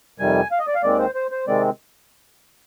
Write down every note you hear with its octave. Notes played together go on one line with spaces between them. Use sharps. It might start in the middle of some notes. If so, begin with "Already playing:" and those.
F2 C3 D#3 G3 G#5
F5
D#5
D5
F5
D#2 D#3 G#3 C4 D5
C5
C5
C5
C3 D#3 G#3 C4 D5